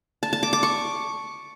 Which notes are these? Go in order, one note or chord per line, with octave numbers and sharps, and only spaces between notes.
A5
A5
D6
D6
C#6